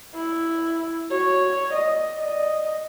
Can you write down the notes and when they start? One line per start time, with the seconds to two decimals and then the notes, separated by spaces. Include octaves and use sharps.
0.15 E4
1.11 F#4 C#5
1.73 D5 D#5
2.19 D#5